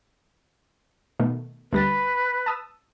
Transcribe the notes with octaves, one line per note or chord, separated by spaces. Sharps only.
B2 D#3 A3
D2 G3 B4 A6
A5 D#6 E6